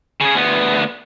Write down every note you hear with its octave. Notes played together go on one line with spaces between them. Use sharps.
C#3 G#4
D2 B3